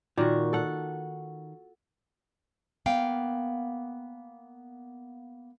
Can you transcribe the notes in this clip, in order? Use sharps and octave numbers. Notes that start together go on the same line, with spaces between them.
A#2 D#3 F#4
A4 F#5
A#3 B3 F5 G5